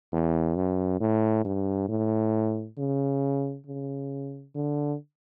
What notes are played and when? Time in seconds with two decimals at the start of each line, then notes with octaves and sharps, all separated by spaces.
0.13 E2
0.56 F#2
1.00 A2
1.45 G2
1.89 A2
2.78 C#3
3.67 C#3
4.55 D3